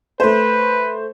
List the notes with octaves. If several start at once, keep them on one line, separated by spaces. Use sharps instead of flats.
A3 B4 C5